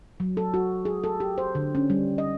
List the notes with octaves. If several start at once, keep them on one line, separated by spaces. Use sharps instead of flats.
F#3
A4
F#4
G#4
A4
G4
C5
D3
C#4
G3
D#5